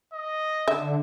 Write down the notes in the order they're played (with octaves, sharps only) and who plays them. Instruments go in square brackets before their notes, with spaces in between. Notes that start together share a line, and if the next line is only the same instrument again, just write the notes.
[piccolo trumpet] D#5
[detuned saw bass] D3 [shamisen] E5